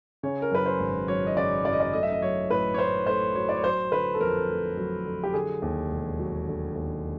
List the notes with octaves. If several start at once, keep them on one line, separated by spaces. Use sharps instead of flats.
C#3 C#5
A#4
F#2 B4
C5
G#1
F#3 C#5
D#5
C#3 D5
F#2 D5
D#5
D5
A3 D#5
E5
D#5
F#3 C#5
A2 B4
C#5
A2 C5
A3 C5
F#3 C#5
D5
C#5
F#3 C5
D3 B4
A4
F2 A#4
A3
F#3
D3
G4
D3 G#4
D#2
E1
F#3
D3
D#2